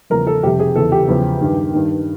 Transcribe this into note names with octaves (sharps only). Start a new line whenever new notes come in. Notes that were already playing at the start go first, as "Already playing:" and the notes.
E2 C#3 F3 A#4
A4
F2 C3 F3 G4
G#4
E2 C#3 E3 A4
G4
E2 C#3 F3
G2 D#3
G2 D#3